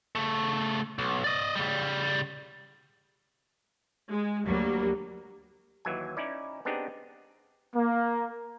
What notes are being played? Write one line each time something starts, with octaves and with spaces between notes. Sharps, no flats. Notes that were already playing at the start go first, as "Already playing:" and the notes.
C#3 A3
B1
D5 D#5
C#3 G3
G#3
D2 F#3 G3 A#3
D#2 E3 F#3 G#5
C#4 D#4 E4 D5
B3 C4 D4 D#4 G4 G#4
A#3